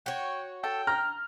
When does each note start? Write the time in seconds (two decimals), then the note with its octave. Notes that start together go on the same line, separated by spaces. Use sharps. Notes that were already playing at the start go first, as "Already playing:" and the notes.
0.06 F#4 C#5 G5
0.64 A4 G5 A5
0.87 A#5 F6